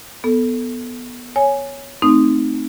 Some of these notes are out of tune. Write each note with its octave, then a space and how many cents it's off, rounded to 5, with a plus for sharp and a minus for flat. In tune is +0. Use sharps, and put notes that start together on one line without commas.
B3 -5 A4 +0
C#5 +0 G#5 +0
A3 +0 C4 +0 D#4 +0